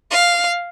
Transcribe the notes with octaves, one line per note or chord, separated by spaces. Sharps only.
F5